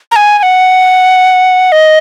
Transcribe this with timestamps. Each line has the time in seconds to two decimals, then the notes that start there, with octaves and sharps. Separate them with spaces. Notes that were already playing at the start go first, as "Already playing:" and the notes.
0.11 A#5
0.16 G#5
0.38 G#5
0.43 F#5
1.72 D#5